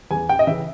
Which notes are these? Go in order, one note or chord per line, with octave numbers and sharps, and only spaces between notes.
E2 G#5
G5
D#5
C#3 E3 E5